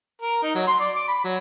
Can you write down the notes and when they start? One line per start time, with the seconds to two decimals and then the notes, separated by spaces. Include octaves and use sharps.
0.21 A#4
0.43 D#4
0.55 F#3
0.67 C6
0.80 D5
0.96 D6
1.08 B5
1.24 F#3